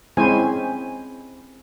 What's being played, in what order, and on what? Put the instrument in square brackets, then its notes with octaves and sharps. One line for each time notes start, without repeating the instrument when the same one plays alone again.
[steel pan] G#3 C4 C#4 E4 C5 G#5